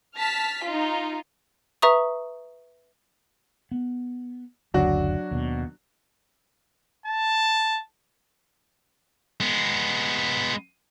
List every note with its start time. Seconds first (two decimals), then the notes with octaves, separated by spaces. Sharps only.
0.18 A5 F6 B6
0.63 D#4 F4
1.82 B4 E5 A#5 C#6 D#6
3.71 B3
4.74 F#1 D2 F#3 D4 F#4
5.31 D#2 B2
7.06 A5
9.40 G#3 B3